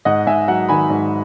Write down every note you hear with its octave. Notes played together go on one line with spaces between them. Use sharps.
G#2 D#5 F#5
G#2 E5 G#5
F#3 F#5 A#5
D#3 G#5 B5
G#2